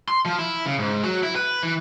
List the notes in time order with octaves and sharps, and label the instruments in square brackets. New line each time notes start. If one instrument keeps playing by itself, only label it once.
[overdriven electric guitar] C6
F3
E4
C#3
G#2
F#3
E4
B4
E3